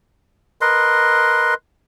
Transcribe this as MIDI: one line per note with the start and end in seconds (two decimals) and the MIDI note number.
0.61 1.54 70
0.61 1.54 71
0.61 1.54 75
0.61 1.54 84